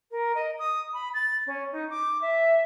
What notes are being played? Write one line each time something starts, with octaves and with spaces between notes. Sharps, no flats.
A#4
D#5
D#6
B5
A6
C#4
D#4
D6
E5